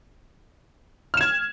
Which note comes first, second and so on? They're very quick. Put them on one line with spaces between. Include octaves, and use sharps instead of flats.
F6 E7 G#6